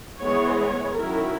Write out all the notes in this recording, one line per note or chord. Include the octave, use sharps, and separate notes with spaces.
E3 G#3 B3 C#5
C#5
D#3 F#3 C#4 E4 A#4